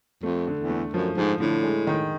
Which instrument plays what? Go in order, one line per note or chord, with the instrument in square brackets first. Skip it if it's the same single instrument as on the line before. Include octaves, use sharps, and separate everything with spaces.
[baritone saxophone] F2 [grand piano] A3
[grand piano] D3
[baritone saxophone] E2
[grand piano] A3
[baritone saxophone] F#2 [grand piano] F3
[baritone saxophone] G#2 [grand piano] F3
[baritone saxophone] A2 [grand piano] D3
[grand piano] G#3
D#3